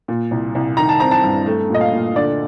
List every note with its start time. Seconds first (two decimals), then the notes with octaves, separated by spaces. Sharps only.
0.08 A#2
0.31 C2
0.55 C2
0.77 D#3 A#5
0.89 A5
1.00 C4 A#5
1.11 A5
1.24 G2
1.46 A3
1.70 A#2 D#5
1.81 F5
1.93 A#2
2.15 D3 D5